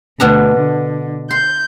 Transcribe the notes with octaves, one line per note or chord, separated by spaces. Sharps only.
D2 B2 D4 A#5
D3
C6 G6